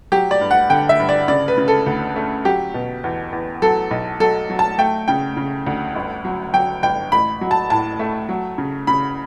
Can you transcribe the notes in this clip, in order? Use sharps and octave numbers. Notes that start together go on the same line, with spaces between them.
F#3 G4
D5
G2
F#5
D3 G5
E5
G2
D5
C#3 D5
B4
C#3
A4
D2
A3
F#3 G4
B2
E2
E2
F#3 A4
B1
F#3 A4
F#3
A5
A3 G5
C#3 G5
C#3
D2
G1
F#3
F#3 G5
G1 G5
A1 B5
F#3
A5
A2 A5
A3
F#3
C#3
C#3 B5